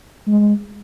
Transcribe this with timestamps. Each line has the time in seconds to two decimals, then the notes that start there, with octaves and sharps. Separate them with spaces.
0.28 G#3